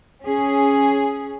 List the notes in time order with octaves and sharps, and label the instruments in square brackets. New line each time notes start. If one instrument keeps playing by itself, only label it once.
[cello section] C#4 G#4